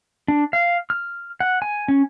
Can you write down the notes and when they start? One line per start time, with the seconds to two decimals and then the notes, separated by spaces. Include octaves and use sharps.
0.28 D4
0.53 F5
0.90 F6
1.40 F#5
1.62 G#5
1.88 C#4